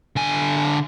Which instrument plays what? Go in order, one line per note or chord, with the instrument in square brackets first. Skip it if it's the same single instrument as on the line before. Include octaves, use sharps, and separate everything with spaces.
[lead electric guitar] D3 G#5